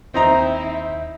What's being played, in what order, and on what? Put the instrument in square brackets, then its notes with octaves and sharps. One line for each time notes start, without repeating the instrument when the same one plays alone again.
[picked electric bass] D#2 [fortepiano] C4 D#4 A#5 [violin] E4